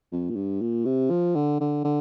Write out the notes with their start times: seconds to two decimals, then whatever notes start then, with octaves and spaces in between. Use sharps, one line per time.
0.12 F2
0.30 A#2
0.36 G2
0.61 A#2
0.85 C3
1.10 F3
1.35 D3
1.60 D3
1.84 D3